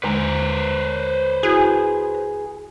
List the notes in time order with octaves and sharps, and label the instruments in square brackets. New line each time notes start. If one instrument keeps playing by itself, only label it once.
[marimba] D#2 D3 G#3 [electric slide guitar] B4 C5 A#5
[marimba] E4 F#4 [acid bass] G#4